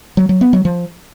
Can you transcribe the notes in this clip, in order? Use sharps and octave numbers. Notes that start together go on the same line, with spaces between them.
F#3
F#3
B3
F#3
F3